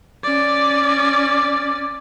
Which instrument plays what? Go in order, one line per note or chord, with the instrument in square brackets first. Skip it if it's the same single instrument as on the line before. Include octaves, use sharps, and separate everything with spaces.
[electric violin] C#4 D5